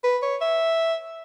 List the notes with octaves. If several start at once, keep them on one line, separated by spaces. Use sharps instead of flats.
B4
C#5
E5